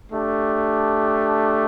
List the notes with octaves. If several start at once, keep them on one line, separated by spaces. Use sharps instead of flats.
A3 D4 G4